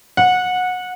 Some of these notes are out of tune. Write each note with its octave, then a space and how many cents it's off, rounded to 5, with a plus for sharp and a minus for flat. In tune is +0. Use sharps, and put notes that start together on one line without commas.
F#5 -20